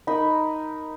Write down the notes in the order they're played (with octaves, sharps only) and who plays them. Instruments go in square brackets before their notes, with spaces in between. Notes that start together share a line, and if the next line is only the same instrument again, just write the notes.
[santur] D#4 A#4 B5